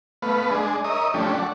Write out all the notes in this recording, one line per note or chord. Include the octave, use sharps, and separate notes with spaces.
A3 B3 B4 F5
G#3 D4 G#4
A#4 C#5 D#5 E5 D#6
F3 A3 C#4 D4 G4
A3 D5 F#5